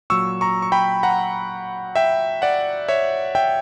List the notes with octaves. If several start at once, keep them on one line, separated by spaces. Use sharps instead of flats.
A#2 F#3 C#6 E6
A#5 C#6
C#6
G5 B5
F#5 A#5
E5 G5
D5 F#5
C#5 E5
E5 G5